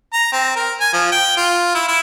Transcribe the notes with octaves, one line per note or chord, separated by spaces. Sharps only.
A#5
C4
A#4
G#5
F3
G5
F4
E4
E4